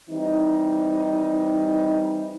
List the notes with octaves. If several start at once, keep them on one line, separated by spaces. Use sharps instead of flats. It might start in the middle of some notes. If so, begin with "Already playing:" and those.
E3 G3 C4 D#4